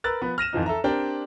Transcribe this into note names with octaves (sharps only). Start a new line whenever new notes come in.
A#4 B4 E6 F#6 A6
F3 B3 B5
F6 A#6 D#7 E7
F2 E3 F3 D#4
A4 E5 A#5
C4 D4 G4 A#4 D5 G5